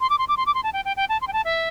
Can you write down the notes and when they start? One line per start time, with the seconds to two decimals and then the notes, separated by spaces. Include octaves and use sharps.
0.01 C6
0.10 D6
0.18 C6
0.28 D6
0.37 C6
0.46 D6
0.54 C6
0.63 A5
0.73 G5
0.85 G5
0.97 G5
1.09 A5
1.21 C6
1.27 G5
1.33 A5
1.45 E5